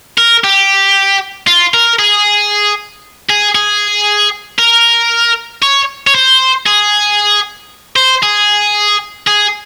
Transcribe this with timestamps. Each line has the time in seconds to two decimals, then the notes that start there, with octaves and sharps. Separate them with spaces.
0.18 A#4
0.44 G4
1.47 F4
1.74 A#4
1.99 G#4
3.29 G#4
3.55 G#4
4.59 A#4
5.62 C#5
6.07 C#5
6.15 C5
6.66 G#4
7.96 C5
8.23 G#4
9.27 G#4